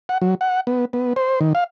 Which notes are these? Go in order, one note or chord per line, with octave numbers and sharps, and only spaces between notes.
F#5
F#3
F#5
B3
B3
C5
D#3
F5